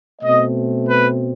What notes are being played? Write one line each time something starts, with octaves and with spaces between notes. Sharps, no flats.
B2 A3 C4 D#5
B4